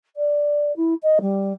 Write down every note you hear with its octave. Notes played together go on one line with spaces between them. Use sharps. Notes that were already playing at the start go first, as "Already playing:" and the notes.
D5
E4
D#5
G3